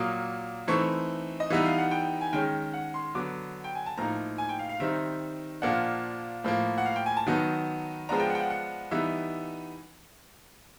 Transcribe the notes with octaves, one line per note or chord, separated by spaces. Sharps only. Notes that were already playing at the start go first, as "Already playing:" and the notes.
Already playing: A#2 F#3 A#3 D#6
E3 A3 C4 D#4 C#6
D#5
E3 G3 B3 D#4 E5
F5
F#5
G5
G#5
D#3 G#3 C#4 G5
F#5
C6
D3 F#3 B3 D6
G5
G#5
A5
A2 F3 A#3 D#4 A#5
G#5
G5
F5
F5
D#3 G3 C4 D#4 E5
A#2 F3 A#3 D4 F#5
A2 F3 A#3
F#5
F5
G5
G#5
A5
D#3 F#3 B3 D#4
F3 G#3 B3 D4 A#5
G5
F#5
G5
F#5
F#5
E3 G3 B3 D#4 E5